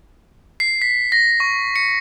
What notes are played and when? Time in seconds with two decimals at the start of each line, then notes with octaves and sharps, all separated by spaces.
0.60 C7
0.82 B6
1.12 A#6
1.40 C#6
1.76 C#7